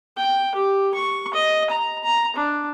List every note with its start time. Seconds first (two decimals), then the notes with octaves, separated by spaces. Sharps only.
0.17 G5
0.55 G4
0.94 C#6
1.34 D#5
1.70 A#5
2.03 A#5
2.36 D4